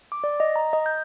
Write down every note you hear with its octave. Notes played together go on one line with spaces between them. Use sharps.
D6
D5
D#5
A#5
D#5
G6